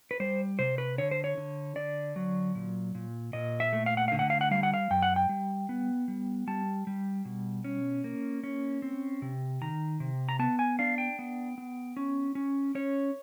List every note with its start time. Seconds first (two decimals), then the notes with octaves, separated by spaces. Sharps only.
0.11 B4
0.20 G3 C5
0.59 C3 C5
0.78 B4
0.98 D3 C#5
1.11 C5
1.24 C#5
1.37 D3
1.76 D3 D5
2.16 F#3
2.55 A#2
2.95 A#2
3.33 A#2 D#5
3.60 E5
3.73 A3
3.86 F5
3.97 F#5
4.08 D3 F5
4.19 F#5
4.30 F5
4.41 F#5
4.51 G3 F5
4.63 F#5
4.74 F5
4.90 F#2 G5
5.03 F#5
5.16 G5
5.29 G3
5.69 B3
6.08 G3
6.47 G3 A5
6.87 G3
7.25 B2
7.64 C#4
8.04 A#3
8.44 C#4
8.82 C4
9.22 C3
9.61 D#3 A#5
10.00 C3
10.29 A#5
10.39 B3 A5
10.59 G#5
10.79 D4 F5
10.98 G5
11.19 B3
11.58 B3
11.97 C#4
12.35 C#4
12.75 C#4 C#5